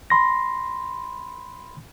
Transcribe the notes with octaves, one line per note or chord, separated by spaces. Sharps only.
B5 C6 A#6